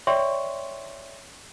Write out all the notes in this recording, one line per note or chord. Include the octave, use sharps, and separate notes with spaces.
C#5 D5 E5 G5 C6 C#6